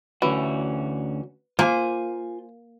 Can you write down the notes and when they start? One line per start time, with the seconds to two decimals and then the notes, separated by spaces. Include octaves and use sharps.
0.22 D2 E3 C#4 F#4
1.59 A#3 F4 C5 G#5